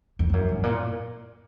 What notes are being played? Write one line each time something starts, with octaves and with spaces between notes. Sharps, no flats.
F2
F2
F#2
G#2
A#2